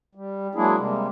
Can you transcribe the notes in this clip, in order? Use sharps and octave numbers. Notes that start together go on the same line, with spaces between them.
G3
F#3 G#3 A#3 D4 E4 G#4
C3 G3 G#3 A#3